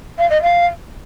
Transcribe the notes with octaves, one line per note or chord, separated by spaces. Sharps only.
F5
D#5
F5